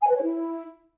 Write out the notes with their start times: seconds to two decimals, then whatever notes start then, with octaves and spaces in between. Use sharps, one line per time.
0.02 G#5
0.09 B4
0.16 C#5
0.22 E4